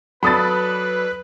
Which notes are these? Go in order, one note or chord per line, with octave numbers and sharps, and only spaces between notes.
F#3 A4 B4 D5 B5 D#6 A6